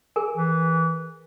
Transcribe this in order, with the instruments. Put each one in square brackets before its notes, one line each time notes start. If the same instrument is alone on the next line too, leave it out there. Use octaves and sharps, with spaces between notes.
[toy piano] G#4 A#4 G#5
[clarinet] E3